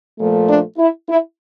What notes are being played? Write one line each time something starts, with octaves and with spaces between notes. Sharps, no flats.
A#2 F3 A3
D4
E4
E4